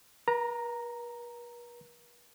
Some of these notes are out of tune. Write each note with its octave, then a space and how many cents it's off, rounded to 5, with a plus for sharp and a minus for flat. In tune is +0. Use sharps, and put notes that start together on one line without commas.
B4 -45 A#5 +0